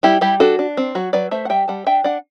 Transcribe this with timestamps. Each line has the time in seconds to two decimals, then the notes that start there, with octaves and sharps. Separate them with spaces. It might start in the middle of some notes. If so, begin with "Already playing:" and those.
0.03 G3 E4 G4
0.21 G3 E4 G4
0.40 D4 F#4 A4
0.59 D4
0.77 C4
0.95 F#3 F#4
1.13 F#3 B4 D5
1.31 A3 C5 E5
1.45 F#5
1.49 G3 E5 G5
1.68 G3 F#5 A5
1.86 D4 E5 G5
2.04 D4 D5 F#5